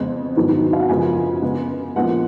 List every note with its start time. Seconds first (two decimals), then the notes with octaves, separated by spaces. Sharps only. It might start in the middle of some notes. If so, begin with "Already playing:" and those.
Already playing: F2 C#3 G#3 B3
0.36 G#2 D#3 F#3 B3
0.73 F5
0.81 F#5
0.89 F#2 C#3 F3 G#3 B3 G#5
1.42 C#3 G#3 B3
1.96 A#2 F3 G#3 B3 F#5